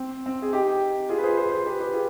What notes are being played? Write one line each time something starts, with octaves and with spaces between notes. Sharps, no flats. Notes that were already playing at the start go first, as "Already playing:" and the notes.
Already playing: C4
C4
G#4
D#4 G4
F4 G#4
B4
G#4 C5
G#4 C5
G#4 C5
G4 B4
G4 B4
F4 G#4